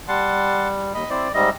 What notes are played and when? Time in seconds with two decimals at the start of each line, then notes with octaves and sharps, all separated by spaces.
0.08 G3 F#5 A5 C6
0.94 D#2 D#5 B5
1.10 C4 E4 C5 D5
1.34 G#2 G3 D#5 E5